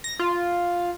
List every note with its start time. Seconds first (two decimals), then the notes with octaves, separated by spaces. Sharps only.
0.04 A#6
0.19 F4